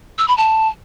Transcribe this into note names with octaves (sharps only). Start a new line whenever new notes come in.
E6
B5
A5